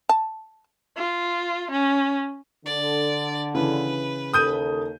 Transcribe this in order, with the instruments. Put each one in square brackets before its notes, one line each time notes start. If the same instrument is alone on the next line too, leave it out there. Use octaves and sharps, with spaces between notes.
[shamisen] A5
[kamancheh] F4
C#4
[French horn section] D3 [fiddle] D5
[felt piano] C#3 E3 [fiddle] B4
[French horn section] D#2 A4 [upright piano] D#6 G6 D#7